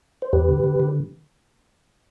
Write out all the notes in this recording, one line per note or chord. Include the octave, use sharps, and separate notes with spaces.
C5
E2 G4 B4
D3
D3
D3